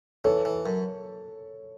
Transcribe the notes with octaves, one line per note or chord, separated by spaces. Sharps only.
E3 A4 C#5
E3
F#2